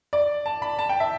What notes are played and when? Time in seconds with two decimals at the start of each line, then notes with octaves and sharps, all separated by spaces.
0.13 D5
0.46 A5
0.62 B5
0.79 A5
0.89 G5
1.00 E5